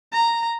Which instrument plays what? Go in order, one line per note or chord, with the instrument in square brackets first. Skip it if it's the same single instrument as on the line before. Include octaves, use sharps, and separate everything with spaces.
[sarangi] A#5